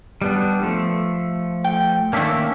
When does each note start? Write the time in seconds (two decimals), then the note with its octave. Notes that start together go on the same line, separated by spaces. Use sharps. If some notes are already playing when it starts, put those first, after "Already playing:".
0.22 G3 B3 D4
0.63 F3 A3
1.64 G5
2.13 D#3 A#3 C#4 D4 E5